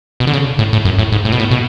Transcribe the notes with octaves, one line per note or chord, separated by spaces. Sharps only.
B2
D3
C#3
A2
A2
F#2
A2
G#2
A2
B2
A2
B2